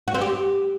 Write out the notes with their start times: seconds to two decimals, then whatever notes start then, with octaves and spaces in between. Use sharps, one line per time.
0.08 F#4
0.15 C4
0.21 G4